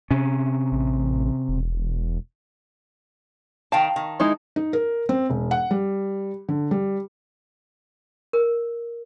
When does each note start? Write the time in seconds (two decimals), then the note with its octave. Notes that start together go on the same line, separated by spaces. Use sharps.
0.11 C3 C#4
0.72 A1
1.49 E1
3.72 D#3 F5 G5 A5
3.96 D#3
4.20 G#3 D#4 E4
4.56 D#4
4.73 A#4
5.09 C4
5.30 E1
5.51 F#5
5.71 G3
6.48 D3
6.71 G3
8.33 A#4